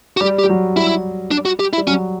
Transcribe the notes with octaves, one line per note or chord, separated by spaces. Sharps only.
F#4
G3 G4
G4
G3
F#3
G3 E4
D4
F#4
G4
E4
G3
F#3 C#4